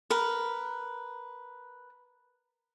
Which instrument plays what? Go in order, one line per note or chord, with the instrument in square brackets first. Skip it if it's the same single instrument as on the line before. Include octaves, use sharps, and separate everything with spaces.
[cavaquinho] A#4 B4